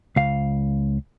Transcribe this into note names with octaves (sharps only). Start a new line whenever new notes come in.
C#2 F5